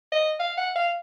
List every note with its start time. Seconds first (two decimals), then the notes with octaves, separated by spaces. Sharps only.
0.12 D#5
0.39 F5
0.57 F#5
0.75 F5